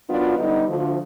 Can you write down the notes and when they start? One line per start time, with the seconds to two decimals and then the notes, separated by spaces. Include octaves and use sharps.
0.09 D#3 F#3 B3 D4 F4
0.38 D3 G3 B3 D#4
0.67 D2 D3 F3